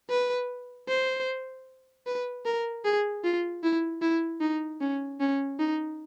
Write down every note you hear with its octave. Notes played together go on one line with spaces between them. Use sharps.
B4
C5
B4
A#4
G#4
F4
E4
E4
D#4
C#4
C#4
D#4